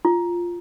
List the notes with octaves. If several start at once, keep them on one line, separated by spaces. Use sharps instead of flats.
F4